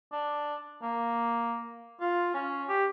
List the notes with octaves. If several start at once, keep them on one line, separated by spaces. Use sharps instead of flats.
D4
A#3
F4
C#4
G4